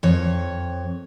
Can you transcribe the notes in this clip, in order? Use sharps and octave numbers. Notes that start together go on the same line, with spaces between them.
F2 C#5